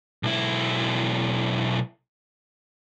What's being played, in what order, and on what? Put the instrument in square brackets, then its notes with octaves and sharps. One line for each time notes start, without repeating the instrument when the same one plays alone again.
[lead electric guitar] B1 E4